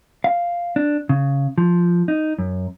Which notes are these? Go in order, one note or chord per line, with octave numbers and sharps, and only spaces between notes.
F5
D4
C#3
F3
D#4
F#2